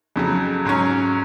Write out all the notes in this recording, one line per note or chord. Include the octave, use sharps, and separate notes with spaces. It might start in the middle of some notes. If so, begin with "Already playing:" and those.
F2 C#3 F#3
G#2 F#3 C#4